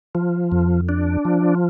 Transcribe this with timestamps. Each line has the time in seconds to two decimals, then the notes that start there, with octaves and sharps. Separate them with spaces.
0.15 F3
0.52 F2
0.89 D4
1.25 F3